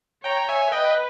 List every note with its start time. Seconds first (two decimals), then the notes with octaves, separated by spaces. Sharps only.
0.24 C#5 G5 A#5
0.49 E5 G#5
0.72 B4 D#5 G5